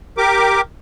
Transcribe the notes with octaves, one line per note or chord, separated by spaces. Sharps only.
G4 A#4 D6